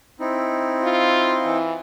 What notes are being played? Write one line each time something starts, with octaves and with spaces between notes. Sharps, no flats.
C4 D#4 E4
F4
E3